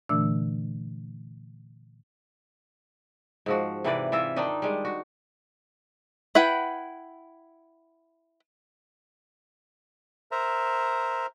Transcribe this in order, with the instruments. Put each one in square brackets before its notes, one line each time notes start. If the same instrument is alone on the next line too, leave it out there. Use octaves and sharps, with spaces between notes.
[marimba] A#2 D3 E3 A3 D4 E6
[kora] G#2 F3 F#4
C3 E3 B4 D5
E3 F4 E5
D#3 D4 D#4 D#5
G3 G#3
F#4
[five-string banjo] E4 B4 F#5 G5
[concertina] A#4 C5 E5 A#5